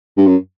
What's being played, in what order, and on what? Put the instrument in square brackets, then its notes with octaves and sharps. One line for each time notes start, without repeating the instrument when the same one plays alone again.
[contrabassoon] G2
F#2